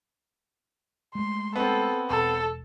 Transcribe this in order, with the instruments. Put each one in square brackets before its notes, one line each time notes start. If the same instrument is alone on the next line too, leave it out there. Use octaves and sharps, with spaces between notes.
[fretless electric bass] G#3 A3 [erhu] C6
[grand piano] B3 C4 [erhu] A4
[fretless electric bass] E1 [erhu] A4